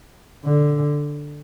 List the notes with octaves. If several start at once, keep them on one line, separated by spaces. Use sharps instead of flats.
D3